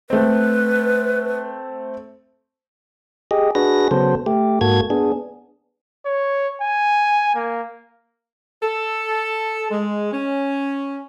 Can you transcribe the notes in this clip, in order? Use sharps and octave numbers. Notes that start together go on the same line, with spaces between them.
A3 C4 B4
G4 G#4 D#5
D4 F#4 G#4 B4 A#6
C#3 F#3 B3 A4 C5
A3 G4
G#2 A#3 F#4 A4 G#6
B3 D4 G#4
C#5
G#5
A#3
A4
G#3
C#4